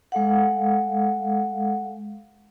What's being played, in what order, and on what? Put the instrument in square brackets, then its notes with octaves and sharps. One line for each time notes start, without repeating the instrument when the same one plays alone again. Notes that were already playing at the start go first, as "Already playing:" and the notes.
[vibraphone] G#3 A4 F5 F#5